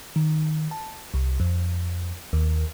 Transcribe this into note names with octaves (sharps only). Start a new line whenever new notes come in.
D#3
A5
C2
F2
D#2